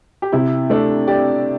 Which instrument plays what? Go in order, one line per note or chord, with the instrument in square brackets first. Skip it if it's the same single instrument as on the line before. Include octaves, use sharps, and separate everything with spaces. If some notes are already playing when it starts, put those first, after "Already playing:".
[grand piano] G4
[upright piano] C3 [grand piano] E4
[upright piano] A3 [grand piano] D4
[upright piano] G4 [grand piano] D5